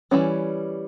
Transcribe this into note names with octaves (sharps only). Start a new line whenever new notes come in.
E3 G3 C#4